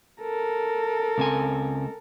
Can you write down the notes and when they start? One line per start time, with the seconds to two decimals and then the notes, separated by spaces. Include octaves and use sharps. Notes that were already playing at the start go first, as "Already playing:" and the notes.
0.22 A4 A#4
1.18 C#2 C4 G#5